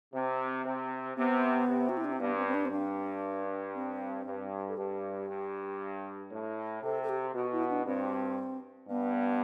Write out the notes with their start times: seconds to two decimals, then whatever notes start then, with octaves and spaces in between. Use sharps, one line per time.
0.14 C3 C4
0.65 C3
1.17 C3 B3
1.68 C3
1.89 F#4
1.97 E4
2.05 D4
2.12 C4
2.20 G2 B3
2.37 C4
2.47 C4
2.54 D4
2.65 C4
2.71 G2 D4
3.75 C4
4.26 G2
4.68 A4
4.77 G2 G4
5.29 G2
6.32 A2
6.83 C3 A4
7.03 A4
7.09 G4
7.35 B2 F#4
7.52 E4
7.70 D4
7.86 G2 C4
8.89 G2 B3